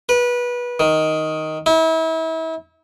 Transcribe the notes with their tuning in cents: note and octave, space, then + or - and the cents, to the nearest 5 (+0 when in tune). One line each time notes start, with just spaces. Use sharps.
B4 -25
D#3 +5
E4 -35